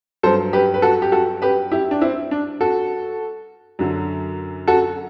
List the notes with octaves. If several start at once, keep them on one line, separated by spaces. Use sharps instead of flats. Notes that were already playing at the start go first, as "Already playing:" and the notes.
G2 F#3 A4 C5
G4 B4
B4
F#4 A4
G4
F#4 A4
G4 B4
E4 G4
D4
C4 E4
D4
F#4 A4
F#2 D3 F#3
F#4 A4